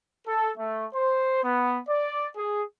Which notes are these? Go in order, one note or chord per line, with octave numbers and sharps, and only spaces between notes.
A4
A3
C5
B3
D5
G#4